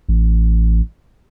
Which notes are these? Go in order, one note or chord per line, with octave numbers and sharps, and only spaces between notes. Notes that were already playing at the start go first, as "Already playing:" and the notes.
A1